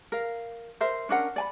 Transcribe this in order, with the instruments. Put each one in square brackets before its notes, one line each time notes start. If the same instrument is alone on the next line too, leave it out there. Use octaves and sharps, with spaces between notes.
[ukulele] A#4 F5
A#4 C5 E5
C#4 D4 A#4 F#5
D5 G#5 B5